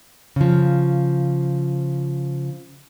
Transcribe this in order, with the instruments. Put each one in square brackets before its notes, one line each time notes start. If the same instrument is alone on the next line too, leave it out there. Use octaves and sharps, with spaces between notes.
[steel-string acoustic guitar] C#3 F3